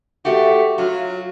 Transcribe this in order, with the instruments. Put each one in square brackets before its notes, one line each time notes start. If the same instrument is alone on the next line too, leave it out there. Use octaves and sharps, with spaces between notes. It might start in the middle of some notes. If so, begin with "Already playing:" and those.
[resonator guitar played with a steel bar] A3 F#4 [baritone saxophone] G4
[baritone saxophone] F#3 [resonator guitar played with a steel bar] F4